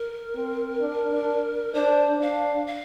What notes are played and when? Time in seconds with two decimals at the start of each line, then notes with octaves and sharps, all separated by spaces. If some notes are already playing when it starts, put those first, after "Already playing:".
Already playing: A#4
0.35 C4
0.81 D4
1.12 D4
1.74 D4 C5
2.20 D4 F5
2.67 F5